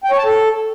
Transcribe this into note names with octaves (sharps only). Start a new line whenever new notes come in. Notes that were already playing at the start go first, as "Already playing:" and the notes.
G5
C#5
A5
A4